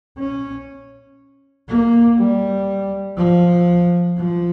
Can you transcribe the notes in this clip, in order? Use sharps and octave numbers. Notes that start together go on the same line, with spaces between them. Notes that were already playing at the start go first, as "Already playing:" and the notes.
C#4
A#3
G3
F3
F3